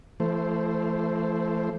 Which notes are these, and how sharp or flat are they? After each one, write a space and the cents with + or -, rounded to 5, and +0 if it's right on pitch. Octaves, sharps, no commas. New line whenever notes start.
E3 +40 A3 -5 C5 +0